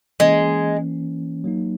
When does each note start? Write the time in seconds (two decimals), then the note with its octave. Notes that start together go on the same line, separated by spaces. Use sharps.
0.20 E3 G#3 A#3 C#4
1.44 F#3 A#3 D#4